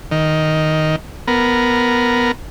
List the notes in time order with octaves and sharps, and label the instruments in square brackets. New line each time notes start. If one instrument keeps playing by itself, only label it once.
[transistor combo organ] D#3
B3 A#4